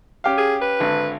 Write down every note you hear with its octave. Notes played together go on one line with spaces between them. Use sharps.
C#4 G4 F5
G#4
B4
G#1 D3